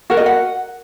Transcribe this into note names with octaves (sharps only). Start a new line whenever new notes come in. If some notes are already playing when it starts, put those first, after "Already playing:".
F#4 A#4 F#5
D#5
F#5